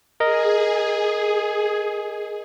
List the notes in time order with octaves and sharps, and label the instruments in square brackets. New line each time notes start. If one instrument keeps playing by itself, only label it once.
[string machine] G#4 [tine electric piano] A#4 D#5